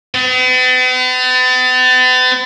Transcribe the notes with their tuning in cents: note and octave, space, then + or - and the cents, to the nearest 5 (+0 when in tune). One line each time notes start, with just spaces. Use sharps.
B3 +45